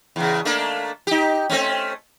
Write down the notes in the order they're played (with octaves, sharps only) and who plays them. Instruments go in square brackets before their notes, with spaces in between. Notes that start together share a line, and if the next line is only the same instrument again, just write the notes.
[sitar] E2 C#3
A3 A#3 D4
D#4 G4
A3 C4 C#4